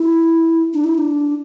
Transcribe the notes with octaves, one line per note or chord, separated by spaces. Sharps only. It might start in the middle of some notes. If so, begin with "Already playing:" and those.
Already playing: E4
D4
E4
E4
D4